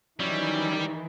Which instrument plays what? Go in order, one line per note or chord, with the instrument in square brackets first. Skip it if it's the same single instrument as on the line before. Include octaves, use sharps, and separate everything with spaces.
[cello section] D#3 E3 [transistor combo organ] F#3 C#4 E4 [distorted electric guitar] G3